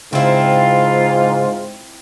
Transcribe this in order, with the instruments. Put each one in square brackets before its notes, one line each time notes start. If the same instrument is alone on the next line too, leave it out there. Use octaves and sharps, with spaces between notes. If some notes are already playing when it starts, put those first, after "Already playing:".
[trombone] G#2 [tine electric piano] C#3 [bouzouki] C4 E4 [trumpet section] F4